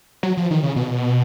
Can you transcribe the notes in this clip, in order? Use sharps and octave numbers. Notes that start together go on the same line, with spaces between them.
F#3
F3
D#3
C#3
B2